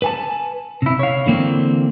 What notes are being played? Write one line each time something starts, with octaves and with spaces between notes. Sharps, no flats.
B4 G#5 A5
C3 E4
C#5 F5
D3 E3 A#3 C4